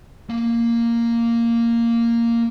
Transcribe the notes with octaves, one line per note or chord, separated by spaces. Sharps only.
A#3 F5